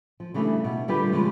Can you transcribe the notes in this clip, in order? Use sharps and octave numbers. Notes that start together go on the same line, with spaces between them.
F3
C#3 E3 G3 A3 C#4 D4
B2
D3 G3 F4 G4 B4
C#3 F3 G3 G#3